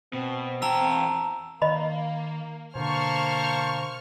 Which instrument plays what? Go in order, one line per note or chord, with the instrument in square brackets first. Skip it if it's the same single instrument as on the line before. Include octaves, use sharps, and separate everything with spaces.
[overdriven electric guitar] B2 [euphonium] C4
[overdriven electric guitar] E2 G5 [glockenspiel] A5 A#5 E6
[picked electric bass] D#3 [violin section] A#3 [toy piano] D#5 B5
[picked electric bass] B2 D3 [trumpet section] A#3 C5 A5 [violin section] C#6 F6